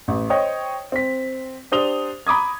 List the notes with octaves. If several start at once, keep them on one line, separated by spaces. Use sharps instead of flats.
A1
C5 C#5 D#5 G5 D#6
C4 B6
D4 G4 C5 D#6 F7 G7
A#5 B5 D6 D#6 G#6